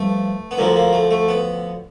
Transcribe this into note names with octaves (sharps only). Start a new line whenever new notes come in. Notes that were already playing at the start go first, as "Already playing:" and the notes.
Already playing: G2 F3 A3
B3
D2 D3 F3 A#3
A#3
A3
A3
B3